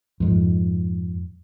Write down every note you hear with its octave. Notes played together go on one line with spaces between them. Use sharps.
F2 G#2